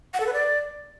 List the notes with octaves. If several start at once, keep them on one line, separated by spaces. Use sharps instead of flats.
F#5
A4
B4
D5